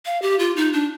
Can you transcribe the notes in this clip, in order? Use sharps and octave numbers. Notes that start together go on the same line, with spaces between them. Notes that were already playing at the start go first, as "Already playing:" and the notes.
F5
G4
F4
D#4
D4